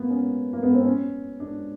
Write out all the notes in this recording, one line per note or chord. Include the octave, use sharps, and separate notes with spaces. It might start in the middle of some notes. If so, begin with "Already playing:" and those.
Already playing: A#3 B3
C#4
A#3
B3
C4
C#4
D4